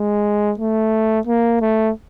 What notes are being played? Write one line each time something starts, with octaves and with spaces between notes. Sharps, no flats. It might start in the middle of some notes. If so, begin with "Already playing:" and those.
Already playing: G#3
A3
A#3
A3